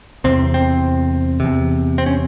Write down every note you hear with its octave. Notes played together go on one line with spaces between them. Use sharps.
E2 C3 C4
C4
E2 C3
C4
C#4